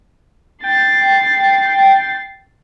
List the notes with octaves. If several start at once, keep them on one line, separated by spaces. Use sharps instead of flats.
G5 A6 C7